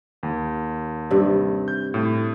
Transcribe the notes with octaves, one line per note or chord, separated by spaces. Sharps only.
D#2
G2 C3
G6
A2